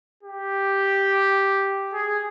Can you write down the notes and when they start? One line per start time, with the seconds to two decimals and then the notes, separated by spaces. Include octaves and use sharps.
0.23 G4
1.93 G#4